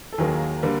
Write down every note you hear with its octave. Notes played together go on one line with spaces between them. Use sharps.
A4
D#2 D#3 F#3 A#3 G#4
D3 G3 A#3